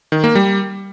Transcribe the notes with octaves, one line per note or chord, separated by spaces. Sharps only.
D#3
A#3
G3